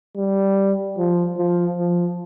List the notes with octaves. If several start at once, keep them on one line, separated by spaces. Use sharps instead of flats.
G3
F3
F3
F3